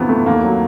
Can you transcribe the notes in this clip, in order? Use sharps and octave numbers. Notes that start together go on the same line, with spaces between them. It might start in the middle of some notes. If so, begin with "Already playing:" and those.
Already playing: D2 C3 E3 F3 B3
A3
D#2 A#3
F#3